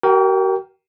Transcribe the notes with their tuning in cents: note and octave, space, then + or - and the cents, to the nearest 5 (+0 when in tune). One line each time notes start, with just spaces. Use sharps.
F#4 +45 A#4 +0 G5 +0